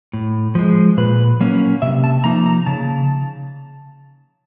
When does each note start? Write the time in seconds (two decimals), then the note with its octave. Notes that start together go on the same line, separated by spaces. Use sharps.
0.13 A2
0.55 F3 G#3
0.97 A#2 B4
1.41 F#3 A#3 C#4
1.82 C3 E5
2.04 A5
2.24 F3 A#3 D#4 A#5
2.46 A#5
2.66 C#3 A5